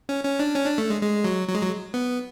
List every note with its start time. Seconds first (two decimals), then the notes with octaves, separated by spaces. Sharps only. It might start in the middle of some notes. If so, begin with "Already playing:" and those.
0.09 C#4
0.24 C#4
0.39 D4
0.55 C#4
0.66 D4
0.78 A3
0.90 G#3
1.01 G#3
1.24 F#3
1.48 F#3
1.55 G#3
1.62 F#3
1.94 B3